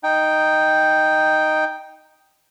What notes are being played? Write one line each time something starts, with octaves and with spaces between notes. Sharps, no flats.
D#4 G5